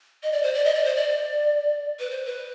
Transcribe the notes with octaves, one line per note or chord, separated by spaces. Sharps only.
D#5
D5
C5
D5
D#5
D5
C5
D5
B4
C5
B4